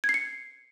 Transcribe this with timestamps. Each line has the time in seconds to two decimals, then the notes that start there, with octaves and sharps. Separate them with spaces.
0.04 G#6
0.09 C7
0.14 C#7